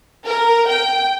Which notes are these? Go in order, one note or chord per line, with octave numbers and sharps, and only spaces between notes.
A#4
G5